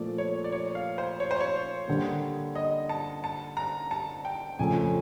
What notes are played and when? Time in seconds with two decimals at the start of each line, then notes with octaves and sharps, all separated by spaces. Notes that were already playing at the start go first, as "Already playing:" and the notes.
Already playing: A#2 F3 A3 D5
0.18 C#5
0.44 D5
0.52 C#5
0.75 F5
0.98 C5
1.20 C#5
1.31 C5
1.40 C#5
1.88 D3 G3 A#3
2.55 D#5
2.89 A5
3.24 A5
3.57 A#5
3.91 A5
4.25 G5
4.59 F2 C#3 F3 A3 G#5